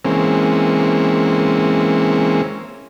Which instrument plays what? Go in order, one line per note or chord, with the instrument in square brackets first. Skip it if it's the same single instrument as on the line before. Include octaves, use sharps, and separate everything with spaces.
[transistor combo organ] E3 G#3 A#3 C4 C#4